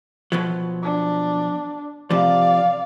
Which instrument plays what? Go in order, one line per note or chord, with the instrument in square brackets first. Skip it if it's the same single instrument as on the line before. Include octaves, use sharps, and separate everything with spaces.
[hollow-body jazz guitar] B2 F3 F#3
[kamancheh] D4
[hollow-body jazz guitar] C3 F3 [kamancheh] D5 F5